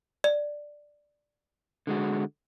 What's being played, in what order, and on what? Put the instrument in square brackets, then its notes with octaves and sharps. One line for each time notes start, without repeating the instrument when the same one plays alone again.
[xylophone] D5
[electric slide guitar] D3 G#3 F#4